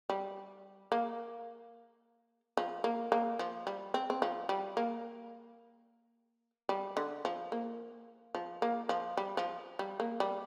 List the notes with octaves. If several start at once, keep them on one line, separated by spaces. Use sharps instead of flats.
G3
A#3
F3
A#3
A#3
F3
G3
C4
C4
F3
G3
A#3
G3
D3
F3
A#3
F3
A#3
F3
G3
F3
G3
A#3
G3